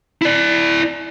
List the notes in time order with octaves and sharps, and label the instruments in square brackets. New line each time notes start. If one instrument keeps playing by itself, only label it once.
[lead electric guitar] E4 D5